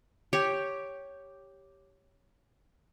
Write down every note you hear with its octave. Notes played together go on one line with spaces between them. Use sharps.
G4 C#5